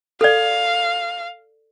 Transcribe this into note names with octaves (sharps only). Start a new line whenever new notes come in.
A4 D5 F5